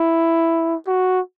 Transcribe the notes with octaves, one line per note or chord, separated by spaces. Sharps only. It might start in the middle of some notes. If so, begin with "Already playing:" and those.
Already playing: E4
F#4